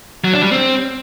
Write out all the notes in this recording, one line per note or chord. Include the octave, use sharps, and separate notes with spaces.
F#3
D4
G3
C4